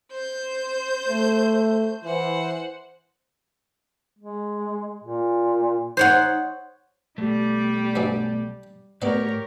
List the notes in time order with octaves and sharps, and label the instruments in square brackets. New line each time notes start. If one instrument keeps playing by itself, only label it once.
[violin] C5 G6
[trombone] A3
[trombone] E3 [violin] C5 F#5
[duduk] G#3
A#2
[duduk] D#4 [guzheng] C5 C#5 F#5
[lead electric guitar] B1 A3 [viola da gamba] G3 G4 D5
[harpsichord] G2 F#3 G#3
[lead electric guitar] A2 [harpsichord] B3 D5 [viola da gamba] G4 A#4 C#5